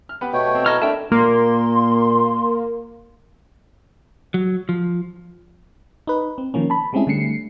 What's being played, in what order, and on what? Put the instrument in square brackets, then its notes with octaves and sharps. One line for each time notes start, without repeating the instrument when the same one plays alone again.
[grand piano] F6
B3 G4 B4
[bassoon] B2 [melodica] A3 C#5 G5
[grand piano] C4
[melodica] E4 [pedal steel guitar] A4 D#5 F6 [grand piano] A#5 C#6 G#6
[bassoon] A3 [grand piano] D4 E5 [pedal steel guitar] A#4 G5 A5
[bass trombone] A#2 [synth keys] A#3 [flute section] C6
[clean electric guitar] F#3
F3
[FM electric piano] D#4 B4
C4
D#3 F3 A#3 C#4
A5 B5
G3 G#3 C4 C#4 E4 G#4
D3 G3 A3 C7 C#7